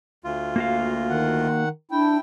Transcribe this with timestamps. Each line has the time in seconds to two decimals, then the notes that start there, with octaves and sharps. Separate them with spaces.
0.24 D2 F4
0.56 A#3 F#4 F5
1.10 D#3 F#5
1.91 D4 E4 G5